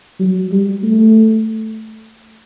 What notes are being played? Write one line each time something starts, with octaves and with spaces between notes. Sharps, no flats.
F#3
G3
A3